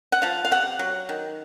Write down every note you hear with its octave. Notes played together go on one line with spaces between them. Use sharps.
F#5
F3 F5
F5
C3 F#5
F#3
D#3